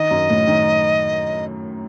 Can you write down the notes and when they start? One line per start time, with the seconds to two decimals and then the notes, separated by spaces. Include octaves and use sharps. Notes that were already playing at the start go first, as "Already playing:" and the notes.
Already playing: D#3 D#5
0.11 F#2
0.30 A2
0.47 D#3